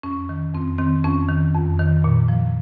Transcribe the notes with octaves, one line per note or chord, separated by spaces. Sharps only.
F2 C#4
D#3
F2 C4
D#3 C4
F2 C#4
D#3
F2
D#3
A#2
F3